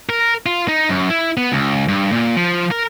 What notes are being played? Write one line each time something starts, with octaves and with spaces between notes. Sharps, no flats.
A#4
F4
D#4
F#2
E4
B3
C#2
G2
A#2
F3
A#4